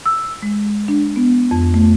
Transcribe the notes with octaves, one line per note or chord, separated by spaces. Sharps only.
E6
G#3
D4
B3
F2
A3